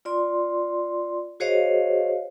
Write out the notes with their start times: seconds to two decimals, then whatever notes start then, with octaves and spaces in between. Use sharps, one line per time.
0.05 F4 D5 C6
1.40 F#4 G#4 C5 C#5 D#5 F5